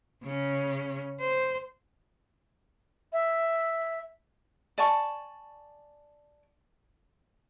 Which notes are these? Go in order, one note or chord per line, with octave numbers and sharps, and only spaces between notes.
C#3 C#4
C5
E5
D5 G#5 A5 C#6